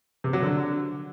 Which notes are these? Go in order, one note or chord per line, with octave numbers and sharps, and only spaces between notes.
C3
F#3
D3